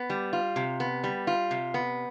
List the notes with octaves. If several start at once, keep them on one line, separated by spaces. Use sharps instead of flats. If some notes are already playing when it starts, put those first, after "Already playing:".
Already playing: B3
G3
F4
C3
B3
G3
F4
C3
B3